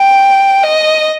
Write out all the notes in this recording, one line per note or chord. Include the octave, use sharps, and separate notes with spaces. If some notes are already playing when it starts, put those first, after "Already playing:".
Already playing: G5
D#5